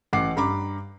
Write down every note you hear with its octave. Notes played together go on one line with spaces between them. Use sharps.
A1 F#5 D6 C7
G2 A#5 B5 D6